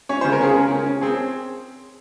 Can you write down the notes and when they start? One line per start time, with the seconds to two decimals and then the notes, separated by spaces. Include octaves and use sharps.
0.09 C#4 C#5
0.21 C5
0.24 C#3
0.32 A#4
0.41 C#4 G#4
0.56 C#4 A#4
0.71 C#4
0.86 C#4
1.01 C4 G#4